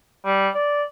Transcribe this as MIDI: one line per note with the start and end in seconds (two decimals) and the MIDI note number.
0.25 0.49 55
0.54 0.83 74